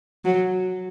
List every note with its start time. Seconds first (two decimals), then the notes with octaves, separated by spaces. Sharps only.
0.25 F#3